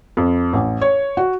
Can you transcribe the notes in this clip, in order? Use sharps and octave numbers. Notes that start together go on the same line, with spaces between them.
F2
A1
C#5
F#4